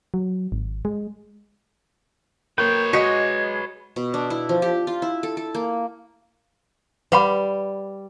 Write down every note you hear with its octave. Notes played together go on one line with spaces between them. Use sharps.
F#3
G#1
G#3
A#3 B4 C#5 G5
G#3 F#4 G#4 D#5 B6 C#7
B2
D4
E4
F3
G4
F4
E4
A4
A4
A#3
G3 B4 F#5 B5